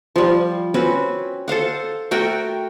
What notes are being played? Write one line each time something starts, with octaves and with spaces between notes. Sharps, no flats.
F3 G3
C4 C#4 F#4 B4
A4 C5 F5 F#5
A3 F#4 A#4 G5